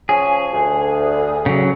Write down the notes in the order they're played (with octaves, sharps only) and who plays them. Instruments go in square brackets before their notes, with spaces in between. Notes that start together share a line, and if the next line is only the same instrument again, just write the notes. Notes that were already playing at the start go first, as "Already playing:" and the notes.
[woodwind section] F3 C#4 G#5 [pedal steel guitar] G#4
[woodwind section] D2
[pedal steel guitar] C#3 F#3